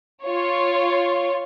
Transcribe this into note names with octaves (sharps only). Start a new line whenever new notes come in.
F4 C#5